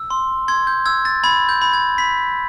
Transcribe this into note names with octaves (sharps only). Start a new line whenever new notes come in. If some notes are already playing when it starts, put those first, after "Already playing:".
Already playing: E6
C6
C6 G#6
G6
E6 G#6
A6
B5 G#6
G6
B5
G#6
B5 B6